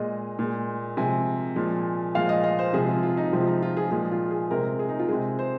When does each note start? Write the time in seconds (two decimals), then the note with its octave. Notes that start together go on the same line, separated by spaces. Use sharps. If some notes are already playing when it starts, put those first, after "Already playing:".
Already playing: A#2 G#3 D#5
0.39 A#2 G#3
0.97 C3 F3 G#3 G#5
1.56 A#2 F3 G#3
2.15 A#2 F3 G#3 F5
2.29 D#5
2.44 D#5
2.59 C5
2.73 C3 F3 G#3 G#4
2.88 F4
3.03 F4
3.17 D#4
3.33 C3 F3 G#3 C4
3.41 F4
3.47 D#4
3.63 F4
3.77 G#4
3.91 A#2 F3 G#3 G#4
4.11 F4
4.31 G#4
4.51 C3 G#3 A#4
4.79 G#4
4.89 D#4
4.99 F4
5.08 C3 G#3 G#4
5.39 C5